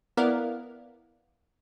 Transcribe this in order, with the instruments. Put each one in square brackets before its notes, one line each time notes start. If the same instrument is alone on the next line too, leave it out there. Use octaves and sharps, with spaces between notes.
[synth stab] B3 E4 A#4 D5 F5 F#5